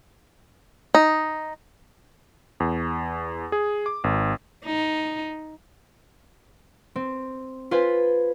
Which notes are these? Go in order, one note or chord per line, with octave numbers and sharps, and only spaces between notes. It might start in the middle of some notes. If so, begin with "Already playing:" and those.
D#4
E2
G#4
D6
G#1
D#4
C4
F4 B4 C5 G#5 B5